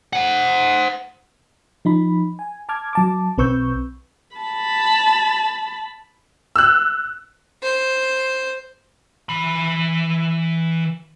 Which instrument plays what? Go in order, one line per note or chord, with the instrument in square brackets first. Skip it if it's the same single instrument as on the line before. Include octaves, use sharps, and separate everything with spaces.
[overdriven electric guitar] C5 F#5
[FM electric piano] F3 D#4 B5
G#5
A5 D6 F6 G#6
F#3 A5 D6
B1 C4 B4 C#6 E6 G6
[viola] A5 B5
[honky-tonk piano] E6 F#6
[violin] C5
[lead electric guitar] E3 B5